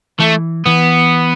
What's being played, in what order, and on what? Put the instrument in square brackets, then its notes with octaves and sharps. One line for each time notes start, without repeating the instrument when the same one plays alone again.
[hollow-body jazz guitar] E3 [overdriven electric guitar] A3
[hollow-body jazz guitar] E3 [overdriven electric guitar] B3